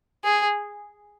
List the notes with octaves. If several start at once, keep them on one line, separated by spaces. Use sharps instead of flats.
G#4